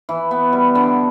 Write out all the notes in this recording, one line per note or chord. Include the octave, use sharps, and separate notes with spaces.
E3
B3
G3
D3